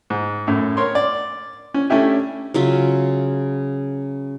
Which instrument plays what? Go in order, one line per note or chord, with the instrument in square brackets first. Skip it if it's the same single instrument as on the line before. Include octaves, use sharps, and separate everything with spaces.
[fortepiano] G#2
F#2 A2
A#4 C#5 C6
D5
C#4
A3 C#4 D4 E4 G4
[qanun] C#3 F#3 F4 E5